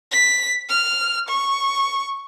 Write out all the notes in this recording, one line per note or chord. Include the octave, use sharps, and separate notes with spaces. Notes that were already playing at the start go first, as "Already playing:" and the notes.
B6
F6
C#6